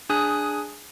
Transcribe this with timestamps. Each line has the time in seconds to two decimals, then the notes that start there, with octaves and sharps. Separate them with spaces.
0.09 D4 G#4 G#5 D#6 F#6